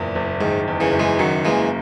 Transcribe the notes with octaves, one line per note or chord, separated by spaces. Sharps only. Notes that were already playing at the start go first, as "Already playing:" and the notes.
Already playing: F#1 E2 A#2
F#1
G#2 D#3
E2
C#3 E3
F#1
E3 G#3
F#2 D#3 F#3
E3 G#3 A#3